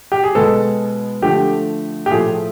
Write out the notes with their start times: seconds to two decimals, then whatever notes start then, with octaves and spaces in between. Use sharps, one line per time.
0.12 G4
0.24 G#4
0.35 B2 G#3 B3 A4
1.22 D3 F3 A3 G4
2.06 G4
2.10 A2 F3 A3 G#4